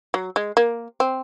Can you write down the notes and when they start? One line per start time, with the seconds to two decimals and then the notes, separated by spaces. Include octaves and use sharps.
0.14 F#3
0.36 G#3
0.57 A#3
1.00 C4